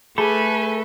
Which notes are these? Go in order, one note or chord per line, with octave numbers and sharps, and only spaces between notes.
A3 G#4 A4 B4 G#5 B5